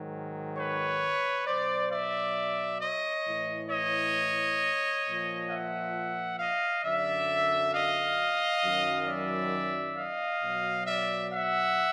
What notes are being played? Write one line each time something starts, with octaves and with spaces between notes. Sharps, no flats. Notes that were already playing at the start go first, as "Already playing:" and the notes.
Already playing: G#2 D#3 F#3
B4 C#5
B2 F#3 C5 D5
D5 E5
C#5 D#5
A2 E3
C#5 D#5
A#2 F3
E5 F#5
D#5 F5
F#2 D3 F#3 D5 E5
D#5 F5
F#2 D#3 F#3
D5 E5
D#5 F5
B2 F#3
D5 E5
E5 F#5